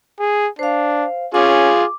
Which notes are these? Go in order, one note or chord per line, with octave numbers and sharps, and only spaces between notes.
G#4
D4 C5 F5
C#4 F4 G#4 D6